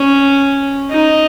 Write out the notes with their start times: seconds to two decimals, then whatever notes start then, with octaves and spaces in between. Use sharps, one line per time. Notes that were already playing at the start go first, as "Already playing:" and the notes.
Already playing: C#4
0.91 D#4